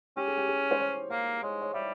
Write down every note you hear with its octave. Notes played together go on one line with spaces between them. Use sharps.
C#4 G4
G#4
G4
G#4
C5
C#5
A#3 F5
G#3 C#5
C#5
G3 E5